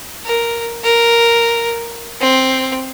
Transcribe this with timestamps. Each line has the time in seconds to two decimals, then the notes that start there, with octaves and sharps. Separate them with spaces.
0.25 A#4
0.83 A#4
2.20 C4